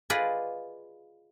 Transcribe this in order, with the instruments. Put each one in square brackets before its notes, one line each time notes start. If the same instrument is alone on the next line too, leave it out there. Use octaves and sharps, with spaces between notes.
[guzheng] F4 G#4 B4 D5 D#5